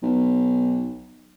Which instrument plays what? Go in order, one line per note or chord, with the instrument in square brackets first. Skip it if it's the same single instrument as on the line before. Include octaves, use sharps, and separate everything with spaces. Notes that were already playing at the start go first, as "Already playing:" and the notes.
[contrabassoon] B1